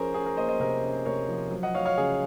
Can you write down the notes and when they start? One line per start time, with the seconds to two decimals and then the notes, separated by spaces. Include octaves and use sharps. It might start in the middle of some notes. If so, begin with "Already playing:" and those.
Already playing: F3 C#4 G#4 A#4 C5
0.14 C#4 G#4
0.26 A#4
0.37 A#3 C5 D#5
0.49 C5 D#5
0.60 C3 A#4
0.83 C#4
1.05 C3 A#4 C#5
1.28 F3
1.51 F#3
1.63 D#5 F#5
1.74 F#3 C#5 F5
1.85 C#5 F5
1.97 C#3 G#4